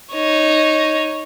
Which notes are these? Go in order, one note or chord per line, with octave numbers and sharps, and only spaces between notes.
D#4 C#5